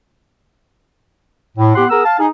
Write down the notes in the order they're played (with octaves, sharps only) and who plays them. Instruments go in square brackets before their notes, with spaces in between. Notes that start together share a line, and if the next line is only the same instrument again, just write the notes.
[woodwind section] A2
A2 B3 G4 F#5 C6
B3 G#4 A#4 A#5 E6
F5 A5
D#4 G#4